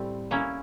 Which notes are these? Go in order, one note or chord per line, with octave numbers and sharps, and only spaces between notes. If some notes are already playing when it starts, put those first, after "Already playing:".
Already playing: A2 G3 C4
A#3 C#4 E4